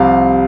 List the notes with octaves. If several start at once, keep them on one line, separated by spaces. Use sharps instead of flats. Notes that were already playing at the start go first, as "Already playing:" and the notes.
Already playing: C2 C3 F3 F5